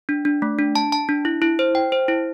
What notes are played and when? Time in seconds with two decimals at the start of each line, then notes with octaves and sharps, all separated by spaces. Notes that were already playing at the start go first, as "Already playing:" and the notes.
0.09 D4
0.25 D4
0.42 A3
0.58 D4
0.75 A5
0.92 A5
1.09 D4
1.25 E4
1.42 E4
1.59 C5
1.75 G5
1.92 C5
2.08 E4